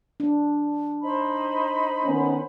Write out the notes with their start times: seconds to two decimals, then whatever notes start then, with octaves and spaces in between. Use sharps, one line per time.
0.20 D4
1.01 D#4 C5 B5
2.05 D#3 B3 C#4